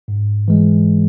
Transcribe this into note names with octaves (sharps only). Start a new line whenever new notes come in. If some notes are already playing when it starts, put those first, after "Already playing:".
G#2
E3 G#3